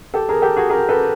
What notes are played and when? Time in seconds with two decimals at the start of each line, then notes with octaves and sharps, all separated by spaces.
0.14 G4 A4
0.29 G#4 A#4
0.42 G4 A4
0.56 F#4 G#4
0.70 G#4 A#4
0.89 A4 B4